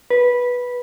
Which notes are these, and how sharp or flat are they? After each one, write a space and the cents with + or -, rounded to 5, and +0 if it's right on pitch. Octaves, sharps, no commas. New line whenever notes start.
B4 -10